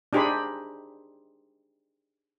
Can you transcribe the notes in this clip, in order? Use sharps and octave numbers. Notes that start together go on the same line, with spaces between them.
D4 D#4 G4 G#4 C5 B5